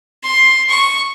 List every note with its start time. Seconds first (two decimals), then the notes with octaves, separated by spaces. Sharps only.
0.23 C6
0.69 C#6